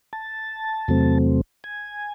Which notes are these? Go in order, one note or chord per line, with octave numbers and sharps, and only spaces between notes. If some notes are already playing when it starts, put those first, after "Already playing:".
A5
E2 C3 F#3 A3 C4
G#5